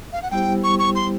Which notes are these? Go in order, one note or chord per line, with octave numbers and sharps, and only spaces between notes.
F5
F#5
G3 B3 E4 G4 C5 G5
C#6
C#6
C6